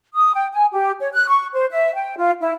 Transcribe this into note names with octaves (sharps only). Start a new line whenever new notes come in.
D#6
G5
G#5
G4
C#5
F#6
C#6
C5
E5
G5
F4
E4